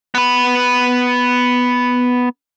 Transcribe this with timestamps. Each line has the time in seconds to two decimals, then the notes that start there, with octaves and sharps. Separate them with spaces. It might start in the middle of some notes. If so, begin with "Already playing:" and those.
0.15 B3 B4